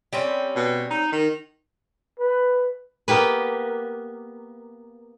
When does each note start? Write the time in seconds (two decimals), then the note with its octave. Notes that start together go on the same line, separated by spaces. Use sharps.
0.13 G3 C4 C#4
0.56 B2
0.91 D#4
1.12 D#3
2.19 B4
3.08 A#3 B3 G4 B4